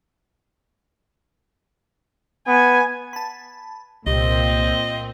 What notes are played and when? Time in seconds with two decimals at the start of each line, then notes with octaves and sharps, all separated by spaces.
2.47 B3 G#5
3.13 A5 B5
4.07 C2 A#2 C4 D#5